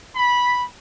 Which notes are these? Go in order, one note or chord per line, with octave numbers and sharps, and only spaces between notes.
B5